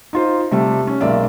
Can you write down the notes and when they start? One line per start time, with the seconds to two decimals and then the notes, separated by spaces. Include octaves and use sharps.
0.13 D#4 F4 C5
0.51 C3 G3 A3
0.87 C#4
1.01 B1 G#3 A#3 D5 E5